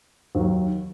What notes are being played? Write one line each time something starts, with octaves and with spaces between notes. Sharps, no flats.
D#2 D#3 F#3